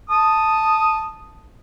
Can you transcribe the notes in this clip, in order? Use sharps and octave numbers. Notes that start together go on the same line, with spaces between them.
A5 D#6